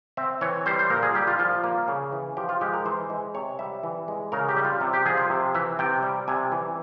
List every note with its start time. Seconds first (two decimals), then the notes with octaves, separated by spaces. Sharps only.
0.17 C4 E5
0.41 E3 C#5
0.66 G3 C5
0.79 C5
0.90 A#2 A#4
1.03 G#4
1.15 G3 G4
1.27 F4
1.39 F3 F4
1.64 A#3
1.88 C#3
2.12 E3
2.37 F3 G4
2.49 F4
2.61 G#3 G4
2.73 A#4
2.85 E3 C5
3.10 G#3
3.35 C3 C#5
3.59 G3 E5
3.83 E3
4.08 G#3
4.32 C#3 A#4
4.49 G4
4.56 G3
4.65 F4
4.81 C3
4.93 G4
5.06 F3 G#4
5.17 C5
5.30 C3
5.54 E3 E5
5.79 C3 G5
6.03 G3
6.28 C3 G#5
6.52 E3